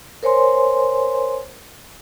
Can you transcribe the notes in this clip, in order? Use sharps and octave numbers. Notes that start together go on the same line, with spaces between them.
A#4 C5 C#5 G#5 C6